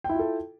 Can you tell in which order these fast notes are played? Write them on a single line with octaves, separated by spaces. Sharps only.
G5 E4 F4 A4